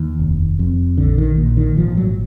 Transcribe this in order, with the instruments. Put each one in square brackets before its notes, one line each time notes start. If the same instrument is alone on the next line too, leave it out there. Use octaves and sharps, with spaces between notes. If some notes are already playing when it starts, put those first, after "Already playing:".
Already playing: [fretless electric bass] D#2 D#3
F1
F2
A#1 D3
D#3
A#2
D#3
G#1 F3
F#3